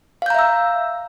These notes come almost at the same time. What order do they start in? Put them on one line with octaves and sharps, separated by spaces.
F5 G6 A#5 E5 E6